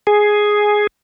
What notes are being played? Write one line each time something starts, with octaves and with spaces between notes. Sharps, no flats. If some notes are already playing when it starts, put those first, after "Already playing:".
G#4